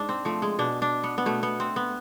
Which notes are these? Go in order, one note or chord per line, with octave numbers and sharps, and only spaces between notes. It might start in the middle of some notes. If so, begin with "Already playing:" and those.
Already playing: G#2 D4
C4
F3 A3
G#3
B2 D4
D4
B3
B3
B2 A3
B3
C4
B3